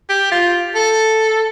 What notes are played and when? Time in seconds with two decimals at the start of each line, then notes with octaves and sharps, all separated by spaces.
0.10 G4
0.32 F4
0.75 A4